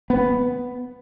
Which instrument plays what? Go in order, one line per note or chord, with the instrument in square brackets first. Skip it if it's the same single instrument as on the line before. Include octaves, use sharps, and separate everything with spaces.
[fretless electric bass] B3